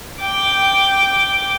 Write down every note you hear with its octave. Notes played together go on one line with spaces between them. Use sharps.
G5 D6